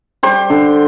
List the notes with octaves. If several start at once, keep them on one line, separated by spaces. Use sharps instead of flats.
G3 C5
D3